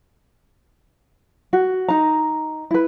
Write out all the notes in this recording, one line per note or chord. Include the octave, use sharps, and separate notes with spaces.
F#4
D#4 A#5
E4 B4